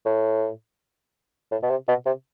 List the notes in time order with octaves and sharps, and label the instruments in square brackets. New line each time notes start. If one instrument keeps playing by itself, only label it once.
[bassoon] A2
A2
B2
C3
B2
C3